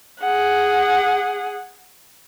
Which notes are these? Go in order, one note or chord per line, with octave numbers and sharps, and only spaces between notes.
G#4 F#5